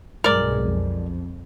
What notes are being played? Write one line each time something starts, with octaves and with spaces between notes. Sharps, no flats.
B1 G2 G#3 A#4 D5
F2